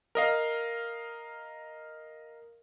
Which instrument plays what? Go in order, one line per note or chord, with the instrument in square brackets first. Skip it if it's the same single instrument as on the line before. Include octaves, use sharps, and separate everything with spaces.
[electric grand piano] A#4 D#5 F5